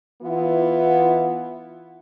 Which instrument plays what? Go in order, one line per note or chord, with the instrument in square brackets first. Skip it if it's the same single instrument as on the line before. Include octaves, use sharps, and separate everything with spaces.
[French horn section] E3 B3 E4 F4